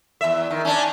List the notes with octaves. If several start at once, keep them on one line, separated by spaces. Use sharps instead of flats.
E2 E5
D#3
C#4 D4